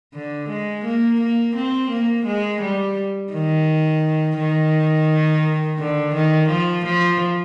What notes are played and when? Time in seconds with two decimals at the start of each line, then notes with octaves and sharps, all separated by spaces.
0.14 D3
0.49 G#3
0.85 A#3
1.20 A#3
1.55 C4
1.91 A#3
2.26 G#3
2.61 G3
3.32 D#3
4.38 D#3
5.79 D3
6.15 D#3
6.49 F3
6.85 F3